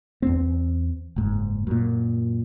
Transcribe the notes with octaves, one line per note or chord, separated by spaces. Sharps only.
E2 C4
F#1 G#2
F#2 A#2